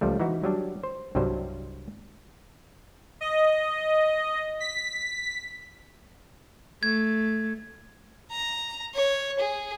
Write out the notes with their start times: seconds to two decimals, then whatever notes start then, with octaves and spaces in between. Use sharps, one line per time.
0.01 C#2 F3 G3 A3
0.20 E3 D#4 E4 F#4
0.44 F#3 G3 D4
0.84 C5
1.15 C2 G2 F#3 G3 C5
3.21 D#5
4.60 B6
6.83 A3 G#6
8.31 A#5
8.94 C#5
9.39 G#4